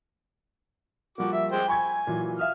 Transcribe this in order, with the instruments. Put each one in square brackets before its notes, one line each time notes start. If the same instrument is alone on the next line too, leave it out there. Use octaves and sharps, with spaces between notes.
[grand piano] F3 G3 A#3 [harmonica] F#4 D6
[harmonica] E5
G#3 C5 G5
[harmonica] G#5 [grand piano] B5 C#6 G#6
[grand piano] A#2 E3 F#3
[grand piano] E5 F5 D#6 [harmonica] F6